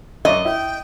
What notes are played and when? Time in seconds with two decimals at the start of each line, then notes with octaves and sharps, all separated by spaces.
0.25 F#2 D5 D#5 C#6
0.45 E4 G5